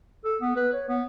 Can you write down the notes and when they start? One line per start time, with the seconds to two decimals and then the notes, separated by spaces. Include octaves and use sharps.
0.24 A4
0.41 B3
0.56 B4
0.73 C#5
0.88 B3